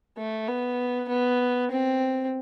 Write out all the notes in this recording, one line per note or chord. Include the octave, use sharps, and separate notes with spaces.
A3
B3
B3
C4